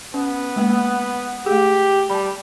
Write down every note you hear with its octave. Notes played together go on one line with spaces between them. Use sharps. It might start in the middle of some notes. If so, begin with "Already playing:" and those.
B3 C#4
G#3 A#3 F#5
A3 G4 G#4
G3 A5 B5